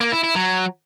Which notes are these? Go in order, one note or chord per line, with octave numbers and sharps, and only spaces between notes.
A#3
E4
E4
F#3